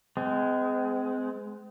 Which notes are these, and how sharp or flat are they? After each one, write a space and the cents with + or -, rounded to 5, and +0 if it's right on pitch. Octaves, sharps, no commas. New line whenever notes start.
G#3 +10 C4 -35